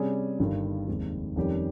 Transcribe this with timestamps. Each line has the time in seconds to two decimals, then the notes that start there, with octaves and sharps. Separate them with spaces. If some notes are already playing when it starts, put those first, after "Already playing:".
Already playing: C3 G3 C#4 G#4
0.39 G1 G2 D#3 G3
0.88 F1 D#2 D#3 G#3 C4
1.36 F2 D#3 G3 C#4 G4